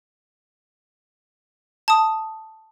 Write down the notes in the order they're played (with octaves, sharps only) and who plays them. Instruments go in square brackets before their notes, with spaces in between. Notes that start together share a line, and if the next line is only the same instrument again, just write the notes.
[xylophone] A5 D#6